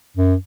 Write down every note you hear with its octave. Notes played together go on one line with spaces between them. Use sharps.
F#2